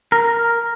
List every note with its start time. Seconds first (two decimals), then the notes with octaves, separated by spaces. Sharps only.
0.12 A#4